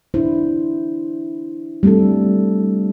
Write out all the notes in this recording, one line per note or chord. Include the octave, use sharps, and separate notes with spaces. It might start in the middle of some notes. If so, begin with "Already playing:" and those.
D4 E4 C5
G3 A3 C4 D4 A4